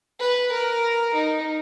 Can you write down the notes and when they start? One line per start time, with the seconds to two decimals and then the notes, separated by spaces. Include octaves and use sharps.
0.20 B4
0.52 A#4
1.14 D#4